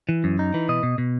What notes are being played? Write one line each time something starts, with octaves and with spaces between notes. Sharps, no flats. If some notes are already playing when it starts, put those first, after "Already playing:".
E3
F#2
D#4
E3
B2 D#5
B2
B2